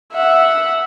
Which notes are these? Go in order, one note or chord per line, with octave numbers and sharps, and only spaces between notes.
E5 F#5